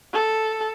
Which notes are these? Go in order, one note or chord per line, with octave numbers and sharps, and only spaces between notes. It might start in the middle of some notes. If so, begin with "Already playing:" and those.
A4